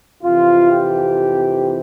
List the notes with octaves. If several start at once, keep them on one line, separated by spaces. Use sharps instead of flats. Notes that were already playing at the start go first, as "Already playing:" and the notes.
F2 C3 E3 F4
G4